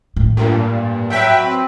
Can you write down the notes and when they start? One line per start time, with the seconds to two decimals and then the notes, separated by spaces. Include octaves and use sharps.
0.16 A2
0.37 G2 A#2
1.10 F#3 B4 E5 G5
1.44 C4